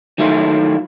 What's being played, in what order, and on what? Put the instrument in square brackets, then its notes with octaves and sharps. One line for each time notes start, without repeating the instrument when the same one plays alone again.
[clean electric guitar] D#3 F#3 A3 C#4 E4 F4